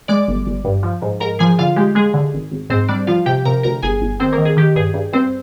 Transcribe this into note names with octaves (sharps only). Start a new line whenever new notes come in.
G#3 D5 D6
G1
G1
G2
F3
G#2
G#2 A#4 A#5
F3 G#4 G#5
D3 F4 F5
G#3 G4
G#3 G#4
D3
G#1
G#1
G#2 C4 C5
G3 D4 D5
F3 F4 F5
C3 G4 G5
C3 A#4 A#5
D2 A#4 A#5
G1 G#4 G#5
G1
D#3 C4 C5
A#3 A#4
D#3
G#4
D#3 G4
G2 G#4
G2
G2 C4 C5